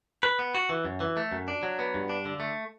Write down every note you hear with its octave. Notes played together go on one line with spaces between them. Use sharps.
B4
B3
F#4
E3
F#2
E3
A3
F#2
D4
F#3
B3
G2
D4
D3
A3